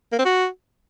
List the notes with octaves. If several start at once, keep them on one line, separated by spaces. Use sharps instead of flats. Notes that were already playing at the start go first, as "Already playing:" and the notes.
A#3
C4
F#4